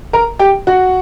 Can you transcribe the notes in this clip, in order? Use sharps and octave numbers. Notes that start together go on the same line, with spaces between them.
A#4 A#5
G4 G5
F#4 F#5